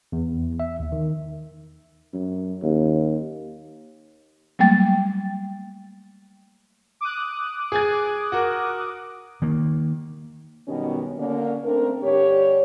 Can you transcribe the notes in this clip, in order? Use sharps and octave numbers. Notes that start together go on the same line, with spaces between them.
E2
E5
D#2
D#3
F#2
D#2
F#3 G3 A3 A#3 G5 A6
D6 D#6 F#6
G#4 G#5 G#6
F#4 A#4
D#3 A#3
F#2 B2 D#3 G3 B3 C#4
D3 A#3 C#4
A3 C4 D4 A#4
G2 D3 G4 C#5